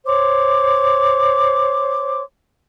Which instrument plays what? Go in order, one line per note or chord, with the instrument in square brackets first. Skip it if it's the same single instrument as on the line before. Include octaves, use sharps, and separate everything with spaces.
[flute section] C5 C#5 C6 D6